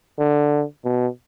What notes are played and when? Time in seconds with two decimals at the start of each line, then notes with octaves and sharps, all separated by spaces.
0.18 D3
0.84 B2